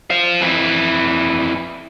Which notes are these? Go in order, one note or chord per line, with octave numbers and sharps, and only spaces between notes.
C5 F5
F2 E3